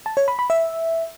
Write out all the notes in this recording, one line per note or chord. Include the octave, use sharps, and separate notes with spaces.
A5
C#5
B5
B5
E5